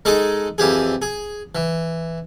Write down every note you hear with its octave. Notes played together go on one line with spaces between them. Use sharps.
G#3 D#4 G#4 A4 D#5
F2 E3 G4 G#4
G#4
E3